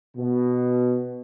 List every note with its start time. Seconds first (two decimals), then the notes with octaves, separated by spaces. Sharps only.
0.17 B2